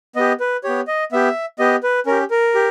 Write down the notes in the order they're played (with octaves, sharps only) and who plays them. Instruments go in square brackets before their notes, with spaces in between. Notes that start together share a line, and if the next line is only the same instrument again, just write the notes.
[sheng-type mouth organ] B3 G4 D#5
B4
B3 G4 C#5
D#5
B3 G4 E5
B3 G4 D#5
B4
C#4 G4 A#4
A#4
G4